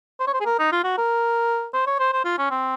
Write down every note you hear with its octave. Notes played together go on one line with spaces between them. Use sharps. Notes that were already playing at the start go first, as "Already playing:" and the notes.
C5
C#5
C5
G#4
A#4
D#4
F4
F#4
A#4
C5
C#5
C5
C5
F4
C#4
C4